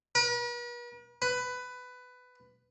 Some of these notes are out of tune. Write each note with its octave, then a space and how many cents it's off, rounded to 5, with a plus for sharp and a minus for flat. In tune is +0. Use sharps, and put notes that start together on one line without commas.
B4 -45
B4 +15